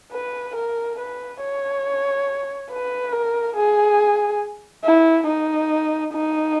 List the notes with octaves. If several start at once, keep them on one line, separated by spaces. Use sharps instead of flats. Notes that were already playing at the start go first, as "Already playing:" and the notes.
B4
A#4
B4
C#5
B4
A#4
G#4
E4
D#4
D#4